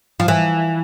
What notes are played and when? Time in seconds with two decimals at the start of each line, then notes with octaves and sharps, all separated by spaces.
0.20 F3
0.28 E3